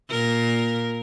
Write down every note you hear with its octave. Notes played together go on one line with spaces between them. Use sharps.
A#2 A#4